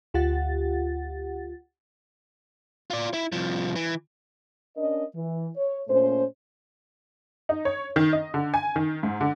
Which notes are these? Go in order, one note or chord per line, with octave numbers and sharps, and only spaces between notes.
D2 F4 G4 F#5 A6
F4 D5
E4
C2 F3
E3
C#4 D4 A#4 D#5
E3
C#5
A#2 A3 C#4 C5
D#4
C#5
D#3
D#5
D3
G#5
D#3
G#2
D3